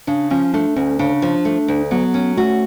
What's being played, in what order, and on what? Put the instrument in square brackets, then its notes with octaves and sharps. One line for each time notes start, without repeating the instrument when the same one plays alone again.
[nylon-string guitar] C#3 [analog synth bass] D4
[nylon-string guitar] F3 [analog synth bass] C#4
[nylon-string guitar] A3 [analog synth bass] D4
[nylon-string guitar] D2 [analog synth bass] C#4
[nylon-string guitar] C#3 [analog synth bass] D4
[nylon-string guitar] F3
A3
D2
[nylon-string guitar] F#3 [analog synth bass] B3
[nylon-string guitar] C#4
[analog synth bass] A3 [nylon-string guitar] F#4